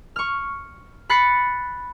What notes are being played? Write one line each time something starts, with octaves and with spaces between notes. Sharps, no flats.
C#6 F6
B5 F#6 A6 C7 C#7